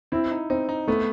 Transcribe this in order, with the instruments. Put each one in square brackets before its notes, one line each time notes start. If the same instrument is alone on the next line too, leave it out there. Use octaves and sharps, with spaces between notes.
[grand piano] C4 [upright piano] E4
[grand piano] D#4
[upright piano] C4 [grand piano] D#4
[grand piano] D#4
[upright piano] A3 [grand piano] B3